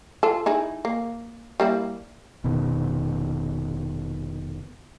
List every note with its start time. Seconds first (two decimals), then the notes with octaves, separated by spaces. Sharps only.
0.23 F4 A4
0.46 D#4 E4 G#4
0.85 A#3
1.60 G3 A#3 E4
2.44 F1 B2 D#3